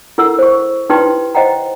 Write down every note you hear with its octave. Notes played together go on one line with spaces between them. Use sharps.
E4 A4 A#4 F#5 E6
C5 C#6
D#4 E4 G4 B4 G5 C6
C5 D#5 F#5 G5 A#5